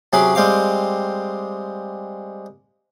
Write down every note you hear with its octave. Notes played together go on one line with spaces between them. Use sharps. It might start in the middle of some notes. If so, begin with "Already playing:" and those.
C3 F#3 C#4 G#4 F#5 D6
G3 G#3 C4 F5 D6